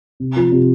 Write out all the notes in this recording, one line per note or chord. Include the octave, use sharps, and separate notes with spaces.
C3
F3
C3